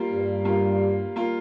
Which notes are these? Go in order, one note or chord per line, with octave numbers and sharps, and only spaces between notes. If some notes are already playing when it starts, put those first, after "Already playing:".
Already playing: G3 A#3 F4
G2
G3 A#3 F4
G3 A#3 F4